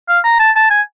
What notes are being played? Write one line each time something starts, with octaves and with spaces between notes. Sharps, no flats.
F5
A#5
A5
A5
G#5